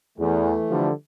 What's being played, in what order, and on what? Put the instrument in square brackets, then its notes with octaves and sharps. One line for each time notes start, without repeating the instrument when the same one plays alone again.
[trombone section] E2 [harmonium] E3 A3
[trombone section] D3 F3 G3